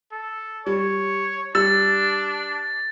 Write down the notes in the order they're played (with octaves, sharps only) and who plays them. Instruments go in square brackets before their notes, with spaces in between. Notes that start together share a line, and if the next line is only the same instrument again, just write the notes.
[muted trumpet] A4
[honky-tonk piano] G3 [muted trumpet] C#5
[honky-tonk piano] G3 E6 [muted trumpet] D4 [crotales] A6